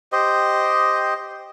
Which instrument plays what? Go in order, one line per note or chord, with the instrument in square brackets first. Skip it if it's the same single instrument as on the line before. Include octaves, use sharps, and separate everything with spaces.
[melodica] G4 C5 D#5